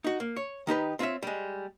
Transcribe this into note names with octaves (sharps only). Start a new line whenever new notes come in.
D#4 F#4
A#3
C#5
D#3 D#4 G4 B4
C4 F4 B4 C#5 E5
G3 G#3